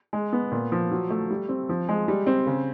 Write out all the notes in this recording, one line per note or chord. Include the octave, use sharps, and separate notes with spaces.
G#3
B3
A#2
F3
F#3
A3
G3
C4
F3
G#3
G3
C4
C#3